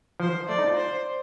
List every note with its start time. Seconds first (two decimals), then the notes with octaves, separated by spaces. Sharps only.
0.20 F3 C5
0.49 A3 D5
0.58 D#4
0.67 F4
0.77 C5